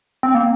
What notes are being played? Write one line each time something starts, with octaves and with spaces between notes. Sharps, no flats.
C4
A#3